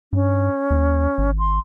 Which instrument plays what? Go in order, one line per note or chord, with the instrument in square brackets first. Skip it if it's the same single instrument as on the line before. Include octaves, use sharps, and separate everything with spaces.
[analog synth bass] G2 [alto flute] C#4
[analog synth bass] D#2
G#1
[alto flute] C6